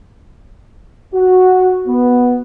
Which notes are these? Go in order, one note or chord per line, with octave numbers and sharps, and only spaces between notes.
F#4
B3